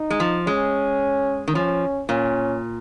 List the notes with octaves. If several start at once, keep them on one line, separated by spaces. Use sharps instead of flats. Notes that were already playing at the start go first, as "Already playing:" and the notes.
Already playing: D#4
G#3
F3
G#3 C#4
D#3
F3 C#4
A#2 C#4